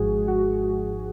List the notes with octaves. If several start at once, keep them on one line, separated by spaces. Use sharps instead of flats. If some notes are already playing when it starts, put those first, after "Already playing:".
Already playing: G#1 G#2 F3 G#3 F#4 G#4
F#4